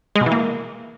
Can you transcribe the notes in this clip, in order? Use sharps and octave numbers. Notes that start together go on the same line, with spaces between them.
G#3
B2
E3
A#3